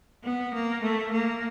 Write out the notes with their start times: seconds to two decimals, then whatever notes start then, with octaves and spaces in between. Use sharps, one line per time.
0.24 B3
0.53 A#3
0.83 A3
1.11 A#3